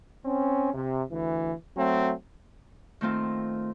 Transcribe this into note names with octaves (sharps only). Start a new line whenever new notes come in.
C4 C#4
C3
D2 E3
F#3 A3 C4
D#3 A3 C4 F4